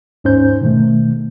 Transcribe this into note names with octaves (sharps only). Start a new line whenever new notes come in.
D#2 G#2 C#4 D#4 C5 G6
B2 D#3 A3